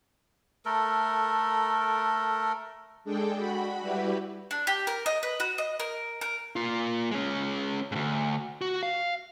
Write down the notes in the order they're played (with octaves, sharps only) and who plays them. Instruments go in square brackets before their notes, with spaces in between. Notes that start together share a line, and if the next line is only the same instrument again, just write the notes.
[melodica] A3 A4 A#4
[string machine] G#3 D4 G#4 A4 G5
F#4 B5
G3 E4 F#4 G4 B4
[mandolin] D4
G4
A#4
D#5
B4
F#4
D#5
A#4
A#4
[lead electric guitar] A#3 F4
G#3 C#4
D2 G#2
F#4
F5